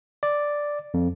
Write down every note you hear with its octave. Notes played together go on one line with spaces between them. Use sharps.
D5
F2